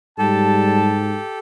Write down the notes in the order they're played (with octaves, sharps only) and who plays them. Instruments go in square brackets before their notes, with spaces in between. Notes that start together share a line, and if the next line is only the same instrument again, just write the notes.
[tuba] G#2 [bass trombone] G3 [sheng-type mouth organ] G4 A4 [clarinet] A5